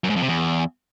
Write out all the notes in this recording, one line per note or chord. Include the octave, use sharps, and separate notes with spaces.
F#2
G#2
F2
C3
E2